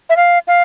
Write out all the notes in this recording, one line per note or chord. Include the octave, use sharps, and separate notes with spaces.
E5
F5
F5